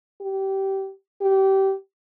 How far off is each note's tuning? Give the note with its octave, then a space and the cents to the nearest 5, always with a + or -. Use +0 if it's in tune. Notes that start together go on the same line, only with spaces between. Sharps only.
G4 -20
G4 -25